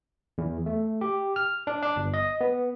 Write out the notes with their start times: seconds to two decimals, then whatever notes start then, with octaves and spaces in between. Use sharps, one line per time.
0.38 E2
0.66 A3
1.01 G4
1.36 F6
1.67 D4
1.83 D4
1.96 G1
2.14 D#5
2.41 B3